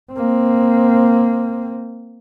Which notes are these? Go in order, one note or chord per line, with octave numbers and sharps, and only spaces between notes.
A#3 C4